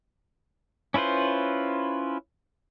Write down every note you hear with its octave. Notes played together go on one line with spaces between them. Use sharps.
C#4 E4 F4 B4 C5